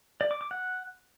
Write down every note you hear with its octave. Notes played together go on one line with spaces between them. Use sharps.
D5
D6
D6
F#5